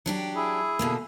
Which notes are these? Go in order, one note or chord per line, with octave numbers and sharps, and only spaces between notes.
F#3 D4 G4
E4 G#4
B2 D3 A#3